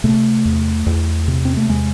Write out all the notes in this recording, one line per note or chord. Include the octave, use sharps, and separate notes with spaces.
C3 A3
E2
E2
C3
C4
A3
E2 G#3